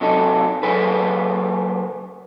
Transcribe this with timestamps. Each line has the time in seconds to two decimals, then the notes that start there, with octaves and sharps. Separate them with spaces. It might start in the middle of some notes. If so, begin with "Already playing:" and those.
0.01 C3 F#3 D#4 A4
0.63 C#3 F#3 G#4 A4 B4